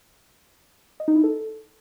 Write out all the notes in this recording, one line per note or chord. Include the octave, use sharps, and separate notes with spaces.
D#5
D#4
E4
A4